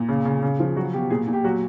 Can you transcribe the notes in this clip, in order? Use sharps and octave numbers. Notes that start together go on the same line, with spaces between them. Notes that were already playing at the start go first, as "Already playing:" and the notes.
Already playing: A#2
C#3
C#3
C#3
F3
F#3 F#4
B2 G4
A#2 G#4
A#2
G4
F#3 F#4